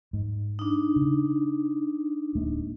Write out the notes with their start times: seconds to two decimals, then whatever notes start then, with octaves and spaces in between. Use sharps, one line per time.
0.13 G#2
0.59 D4 D#4
0.96 C#3
2.35 D1 G#3 A#3